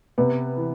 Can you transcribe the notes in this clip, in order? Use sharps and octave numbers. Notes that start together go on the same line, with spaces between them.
C3 B3
E3